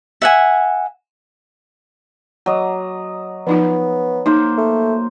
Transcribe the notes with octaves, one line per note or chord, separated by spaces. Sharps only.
E5 F#5 G#5
F#3 D#5 D6
F3 B3 D#4 F4
A#3 D#4 C5
A3